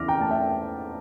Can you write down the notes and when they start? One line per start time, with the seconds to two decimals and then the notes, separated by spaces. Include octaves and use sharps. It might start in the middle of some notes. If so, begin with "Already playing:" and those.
Already playing: E2 C#3 E3 D6 F6 A#6
0.08 G5 A#5
0.20 A3 A5
0.31 E5 G5